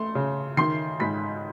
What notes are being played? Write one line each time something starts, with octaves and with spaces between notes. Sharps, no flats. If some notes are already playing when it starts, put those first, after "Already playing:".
Already playing: A3 C6
C#3
D#3 C6 C7
G#2 B5 B6